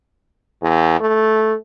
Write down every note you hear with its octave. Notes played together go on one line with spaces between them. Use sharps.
E2
A3